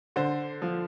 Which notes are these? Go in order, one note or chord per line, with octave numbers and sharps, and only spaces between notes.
D3 C5
F3